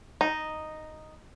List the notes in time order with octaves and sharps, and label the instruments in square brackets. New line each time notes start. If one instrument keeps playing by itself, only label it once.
[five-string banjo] D#4